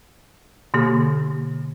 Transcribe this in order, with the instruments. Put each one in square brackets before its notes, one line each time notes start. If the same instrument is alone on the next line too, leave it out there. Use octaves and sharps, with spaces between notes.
[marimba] B2 D3 A#3 G4